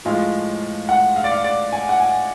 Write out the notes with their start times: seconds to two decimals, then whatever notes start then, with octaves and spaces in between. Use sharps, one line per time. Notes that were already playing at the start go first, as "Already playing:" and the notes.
0.05 A2 F3 G#3 F5
0.89 F#5
1.16 F5
1.24 D5
1.32 F5
1.44 D5
1.72 G#5
1.89 F#5
2.00 G#5